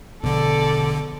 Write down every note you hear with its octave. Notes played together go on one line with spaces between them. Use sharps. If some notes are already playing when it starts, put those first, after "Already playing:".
A#1 B2 D3 A4 D5